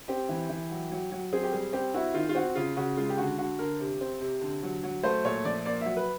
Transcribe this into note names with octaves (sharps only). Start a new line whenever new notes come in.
C4 G4
E3
E3
F#3
F#3
F#3
C4 G#4
G4
G3 G#4
C4 G4
E4 F#4
D#3 F4
F4
C4 F#4
C#3 F4
C#3 F#4
G#3 F4
G4
D3 F#4
D3 F#4
D3 A#4
C3
C4
C3
D3
F#3
F#3
A3 C5
A#2 C#5
F3 D5
A#3 D5
F#3 E5
B4